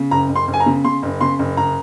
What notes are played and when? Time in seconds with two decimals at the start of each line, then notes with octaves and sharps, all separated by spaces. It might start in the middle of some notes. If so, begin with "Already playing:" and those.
Already playing: C#3
0.11 F#1 A#5
0.30 F#1
0.36 C6
0.48 F#1
0.54 G#5
0.60 A#5
0.66 C#3
0.85 C#3 C6
1.03 F#1
1.21 C#3 C6
1.39 F#1
1.57 F#1 A#5